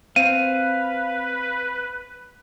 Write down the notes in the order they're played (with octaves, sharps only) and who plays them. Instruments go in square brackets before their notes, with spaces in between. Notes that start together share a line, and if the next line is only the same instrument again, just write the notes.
[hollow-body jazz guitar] C4 [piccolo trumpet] B4 [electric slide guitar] F5 [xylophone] D#7